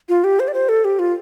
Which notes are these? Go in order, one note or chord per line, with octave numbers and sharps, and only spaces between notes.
F4
G4
C5
D5
C5
A4
G4
F4